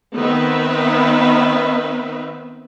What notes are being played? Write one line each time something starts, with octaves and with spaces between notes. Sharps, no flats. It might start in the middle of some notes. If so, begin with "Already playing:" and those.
D#3 B3 C4 D#4 B4 E5